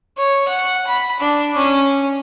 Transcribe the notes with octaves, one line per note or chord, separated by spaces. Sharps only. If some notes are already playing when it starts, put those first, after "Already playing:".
C#5
F#5
B5
D4
C#4